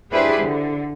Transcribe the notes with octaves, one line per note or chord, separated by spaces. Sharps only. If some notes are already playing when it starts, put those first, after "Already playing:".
D4 E4 G4 G#4 B4 C5
D3